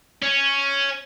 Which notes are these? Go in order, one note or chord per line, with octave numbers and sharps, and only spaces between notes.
C#4